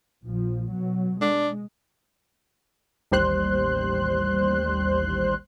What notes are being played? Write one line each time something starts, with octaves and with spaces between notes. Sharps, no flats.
A#1 F3
B2 F#3
G#3 D4
A1 D#2 G3 C5 C6 F#6